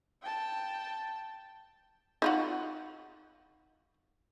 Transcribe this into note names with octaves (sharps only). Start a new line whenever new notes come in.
G5 A5
D#4 F4 F#4